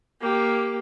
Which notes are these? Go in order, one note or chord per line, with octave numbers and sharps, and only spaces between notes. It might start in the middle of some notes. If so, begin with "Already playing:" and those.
A#3 G4